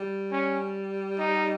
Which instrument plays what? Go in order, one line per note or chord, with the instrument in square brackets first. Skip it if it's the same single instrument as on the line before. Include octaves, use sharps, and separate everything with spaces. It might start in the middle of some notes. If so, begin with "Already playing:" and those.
Already playing: [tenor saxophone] G3
[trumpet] C#4
D#4